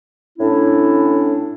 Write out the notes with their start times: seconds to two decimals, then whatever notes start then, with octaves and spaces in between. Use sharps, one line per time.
0.39 A2 C#4 D4 E4